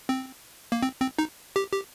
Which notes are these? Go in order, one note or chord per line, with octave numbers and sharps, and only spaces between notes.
C4
A#3
C4
C4
D#4
G4
G4